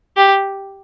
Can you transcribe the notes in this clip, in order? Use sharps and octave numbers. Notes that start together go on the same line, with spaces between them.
G4